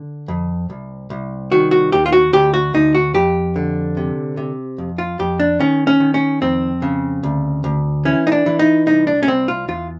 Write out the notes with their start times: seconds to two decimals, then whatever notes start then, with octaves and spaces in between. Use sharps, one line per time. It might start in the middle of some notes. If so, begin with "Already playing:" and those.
Already playing: D3
0.28 F2
0.70 C2
1.10 C2
1.52 D#3 F#4
1.71 F#4
1.92 D#2 G4
2.06 F4
2.13 F#4
2.33 D2 G4
2.54 F#4
2.74 D2 D#4
2.95 F#4
3.14 F2 G4
3.56 D3
3.97 C3
4.37 C3
4.78 F2
4.98 F4
5.19 F2 G4
5.40 D4
5.59 D#3 C#4
5.87 C#4
6.00 D#3
6.14 C#4
6.41 F2 C4
6.82 C#3
7.23 D2
7.64 D2
8.05 E3 C#4
8.27 D#4
8.32 D4
8.46 E3
8.59 D#4
8.86 C2 D#4
9.07 D4
9.23 C#4
9.27 C2 C4
9.48 F4
9.68 E2 F4